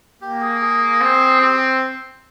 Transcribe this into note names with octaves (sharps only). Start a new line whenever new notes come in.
A#3 G4
G#4
G#4
C4
C4 G4